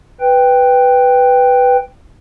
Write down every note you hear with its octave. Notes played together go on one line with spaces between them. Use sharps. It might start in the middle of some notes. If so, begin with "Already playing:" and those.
B4 G5